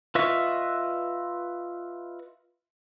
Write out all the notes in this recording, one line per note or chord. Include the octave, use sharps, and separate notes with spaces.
F4 B4 D#5 E5 C#6